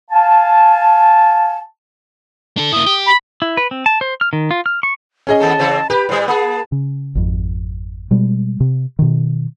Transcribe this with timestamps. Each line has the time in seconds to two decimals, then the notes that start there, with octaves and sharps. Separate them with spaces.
0.11 F5 G#5 A5
2.57 D4 A4
2.73 A#3 E4 D#6
2.86 G4
3.06 B5
3.42 E4
3.57 B4
3.71 C4
3.86 A5
4.01 C5
4.21 F6
4.33 D#3
4.51 F4
4.66 F6
4.83 C#6
5.27 C#4 G#4 D#5
5.40 D#2 A3 A4 A5
5.59 C#3 E3 C4
5.90 G4 B4 B5
6.09 A2 G3 C5
6.28 A#3 G#4 A5
6.72 C#3
7.15 G#1 F2
8.11 B2 G3 G#3
8.60 C3
8.99 B2 D#3